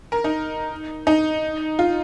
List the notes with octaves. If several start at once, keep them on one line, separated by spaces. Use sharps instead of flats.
A#4
D#4
D#4
F4